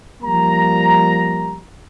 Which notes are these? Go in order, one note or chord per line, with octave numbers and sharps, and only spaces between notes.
F3 G3 A#3 A#5